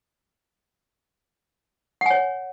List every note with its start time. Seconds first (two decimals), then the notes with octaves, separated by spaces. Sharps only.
2.01 F#5
2.06 G#5
2.10 C#5